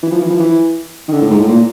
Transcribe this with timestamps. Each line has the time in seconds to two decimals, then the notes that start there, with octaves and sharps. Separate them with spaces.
0.03 E3
0.12 F3
0.21 E3
0.30 F3
0.40 E3
1.08 D#3
1.12 D3
1.22 A2
1.30 G#2
1.40 A2
1.49 A#2